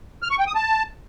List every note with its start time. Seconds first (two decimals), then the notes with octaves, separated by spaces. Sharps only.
0.23 F6
0.31 C#6
0.39 G5
0.47 D#6
0.55 A5